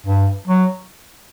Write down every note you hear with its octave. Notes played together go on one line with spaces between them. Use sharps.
G2
F#3